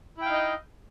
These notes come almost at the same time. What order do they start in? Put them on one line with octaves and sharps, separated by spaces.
E4 G5 F5 D#4 D#5